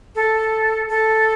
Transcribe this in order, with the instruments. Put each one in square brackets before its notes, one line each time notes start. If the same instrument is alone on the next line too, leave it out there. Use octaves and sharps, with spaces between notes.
[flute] A4
A4